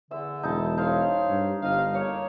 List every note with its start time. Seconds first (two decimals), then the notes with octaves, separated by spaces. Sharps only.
0.11 E2 D3 E5
0.43 E1 D#4 E4 A5
0.78 D#4 C5 C#5 F5
1.28 G2
1.62 G1 C3 D#5 F5
1.94 A#3 C#5